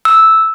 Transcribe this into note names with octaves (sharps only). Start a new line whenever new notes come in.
E6